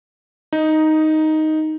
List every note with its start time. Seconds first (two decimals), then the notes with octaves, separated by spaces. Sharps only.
0.53 D#4